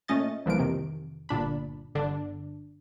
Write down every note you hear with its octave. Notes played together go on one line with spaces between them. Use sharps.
A#2 A3 C#4 D#5 A6
C2 E3 F3 A#3 D7
F2 C3 D#3
G1 A#2 D4 B5
G1 D3 D4